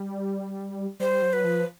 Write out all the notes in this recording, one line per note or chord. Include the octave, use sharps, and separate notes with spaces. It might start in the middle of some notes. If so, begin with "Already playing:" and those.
Already playing: G3
G3 C5
F#3
B4
F3